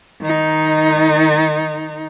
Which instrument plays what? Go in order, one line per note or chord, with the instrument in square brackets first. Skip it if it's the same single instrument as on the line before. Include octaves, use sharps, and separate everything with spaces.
[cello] D#3 D#4